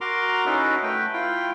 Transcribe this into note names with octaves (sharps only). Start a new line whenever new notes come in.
F#4 A#4 A#5 C6 D6
C#4 D#4 E4 F#4 A4 B4
A3 B4 G5
E4 F4 G5